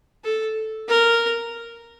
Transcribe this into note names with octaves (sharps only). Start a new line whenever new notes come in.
A4
A#4